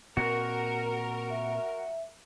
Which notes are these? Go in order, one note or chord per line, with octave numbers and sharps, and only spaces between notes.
A#2 C4 F#4 A#4
E5